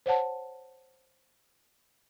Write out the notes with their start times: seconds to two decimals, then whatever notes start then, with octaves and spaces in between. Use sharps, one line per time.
0.06 C5 C#5 F#5 A5